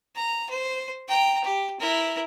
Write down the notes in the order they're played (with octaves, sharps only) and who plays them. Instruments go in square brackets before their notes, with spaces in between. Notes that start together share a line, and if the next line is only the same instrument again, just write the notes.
[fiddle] A#5
C5
G5 A#5
G4
E4 A#4